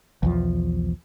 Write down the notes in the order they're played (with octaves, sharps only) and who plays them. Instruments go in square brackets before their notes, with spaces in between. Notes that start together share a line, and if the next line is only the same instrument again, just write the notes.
[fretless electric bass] B1 E2 F3